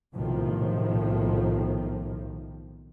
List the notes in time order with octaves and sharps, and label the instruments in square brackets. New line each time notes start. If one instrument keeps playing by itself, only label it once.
[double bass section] B1 A2 C3 D#3 F3